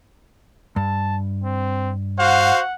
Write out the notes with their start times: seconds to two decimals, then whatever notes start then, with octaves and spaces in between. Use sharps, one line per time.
0.76 G2 A5
1.44 C4
2.19 F#4 C5 F5 F#5